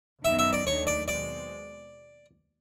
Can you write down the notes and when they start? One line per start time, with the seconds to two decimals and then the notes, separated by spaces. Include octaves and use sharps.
0.24 F#2 D#3 F#3 B3 E5
0.39 E5
0.53 D5
0.66 D#2 D#3 F#3 A3 D4 C#5
0.87 D5
1.08 B2 G#3 C4 D5